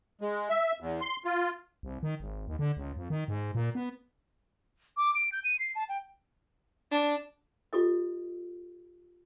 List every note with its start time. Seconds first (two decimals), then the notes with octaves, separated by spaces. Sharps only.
0.21 G#3
0.50 E5
0.80 E2
1.01 C6
1.25 F4
1.83 C2
2.03 D#3
2.20 G#1
2.47 D#2
2.59 D3
2.77 C#2
2.97 F2
3.10 D#3
3.28 G#2
3.55 A#2
3.75 B3
4.97 D6
5.15 D7
5.32 G6
5.44 D#7
5.59 C7
5.75 A5
5.89 G5
6.91 D4
7.73 F4 G4 A4 D#5